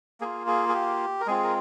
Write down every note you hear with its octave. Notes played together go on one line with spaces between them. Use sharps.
A#3 F4 G#4
G#4
G#4
G4
A#4
G#3 C4 F4 G#4
A#4